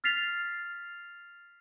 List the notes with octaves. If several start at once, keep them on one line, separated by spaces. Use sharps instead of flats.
F6 A6 B6 C7 F7